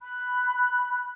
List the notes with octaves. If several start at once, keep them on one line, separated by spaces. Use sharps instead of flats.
B5 F#6